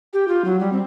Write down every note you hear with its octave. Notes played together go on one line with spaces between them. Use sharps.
G4
F4
F#3
G3
C4